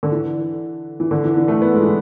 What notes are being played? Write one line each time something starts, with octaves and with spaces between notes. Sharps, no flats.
D3
E3
E3
D3
E3
E3
A3
B3
G#3
E3